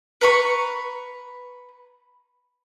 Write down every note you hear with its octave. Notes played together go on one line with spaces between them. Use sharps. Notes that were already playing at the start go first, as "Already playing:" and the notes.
B4 A#5 B5 C#6